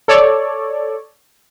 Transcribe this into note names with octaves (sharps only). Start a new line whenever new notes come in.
A4 C#5 D5